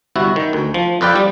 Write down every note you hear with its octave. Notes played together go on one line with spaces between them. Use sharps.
G1 C3 E4 F#4
D#3
D2
F3
F2 F4 B4 D5 G5
G3